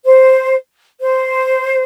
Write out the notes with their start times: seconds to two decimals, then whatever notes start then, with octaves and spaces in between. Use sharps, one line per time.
0.05 C5
1.00 C5